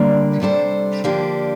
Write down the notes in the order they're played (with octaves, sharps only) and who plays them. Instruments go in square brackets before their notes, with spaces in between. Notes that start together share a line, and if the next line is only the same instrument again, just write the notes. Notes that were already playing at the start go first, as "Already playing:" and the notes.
Already playing: [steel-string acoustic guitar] D3 G3 A#3 D4
C3 G3 D4 A4 C5
D3 F3 A#3 D4 G4